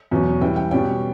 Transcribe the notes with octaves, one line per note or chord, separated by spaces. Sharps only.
E2 B2 F#3 C#4
C#3 E3 G3 G5
G5
B2 G3 C#4 G5